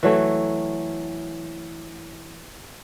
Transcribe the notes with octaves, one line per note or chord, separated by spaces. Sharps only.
E3 F#3 A3